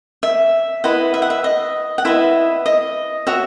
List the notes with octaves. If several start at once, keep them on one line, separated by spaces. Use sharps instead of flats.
E5
E4 B4 D#5 F#5
E5
F#5
E5
D#5
F#5
E4 B4 D#5 E5
D#5
F#4 C#5 E5